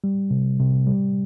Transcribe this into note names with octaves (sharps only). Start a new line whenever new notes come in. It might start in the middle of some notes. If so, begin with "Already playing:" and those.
G3
C3
C3
G3